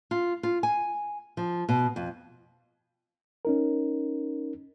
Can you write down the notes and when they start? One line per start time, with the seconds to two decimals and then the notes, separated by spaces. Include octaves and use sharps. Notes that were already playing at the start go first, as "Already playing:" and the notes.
0.11 F4
0.43 F4
0.63 G#5
1.37 F3
1.69 B2
1.96 F2
3.45 C#4 D#4 A#4